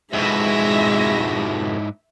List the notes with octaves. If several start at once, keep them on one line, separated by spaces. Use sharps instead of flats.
F2 G#2 B2 G#3 E4 E5 A#6